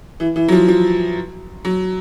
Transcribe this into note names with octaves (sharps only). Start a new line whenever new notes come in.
E3
E3
F#3
F3
F3
F#3